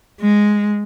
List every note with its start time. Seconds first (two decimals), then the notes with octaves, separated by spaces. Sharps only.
0.21 G#3